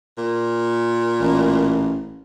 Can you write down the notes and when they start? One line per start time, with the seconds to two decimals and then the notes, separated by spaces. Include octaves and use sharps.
0.18 A#2
1.20 A1